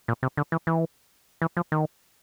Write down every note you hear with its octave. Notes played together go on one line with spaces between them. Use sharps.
A#2
C3
D3
E3
E3
E3
F3
D#3